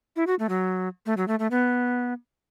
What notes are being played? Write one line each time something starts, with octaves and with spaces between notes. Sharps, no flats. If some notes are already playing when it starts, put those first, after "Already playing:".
E4
F#4
A3
F#3
A3
F#3
A3
A3
B3